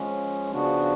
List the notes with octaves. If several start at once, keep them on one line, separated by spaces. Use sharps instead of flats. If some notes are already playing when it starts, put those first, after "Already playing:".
Already playing: F3 G#3 C#4
C#3 F3 B3 D4 F#4